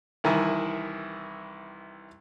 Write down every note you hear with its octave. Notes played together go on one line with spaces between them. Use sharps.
C2 D#3 E3 E4